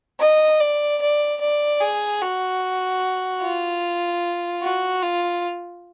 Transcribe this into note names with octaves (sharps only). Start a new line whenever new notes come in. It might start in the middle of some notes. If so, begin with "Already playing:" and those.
D#5
D5
D5
D5
G#4
F#4
F4
F#4
F4